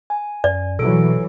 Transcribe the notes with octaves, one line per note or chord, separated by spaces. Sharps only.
G#5
F#2 D5
B2 E3 F#3 A4 D7